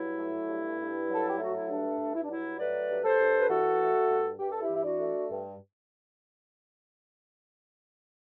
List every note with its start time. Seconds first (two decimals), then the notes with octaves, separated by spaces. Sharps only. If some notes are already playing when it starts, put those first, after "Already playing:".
Already playing: G2 F#3 E4
0.18 A3
0.48 G2
0.79 G2
1.09 F#3 A4
1.28 G4
1.38 A3 F#4
1.55 E4
1.69 G2 D4
1.99 G2
2.14 E4
2.22 D4
2.29 F#3 E4
2.58 A3 B4 D5
2.89 G2
3.04 A4 C5
3.19 G2
3.39 B4
3.49 E3 F#4 A4
3.79 A3
4.09 G2
4.39 G2 G4
4.51 A4
4.61 E4 G4
4.69 E3
4.75 E4
4.84 D4 F#4
4.99 A3
5.30 G2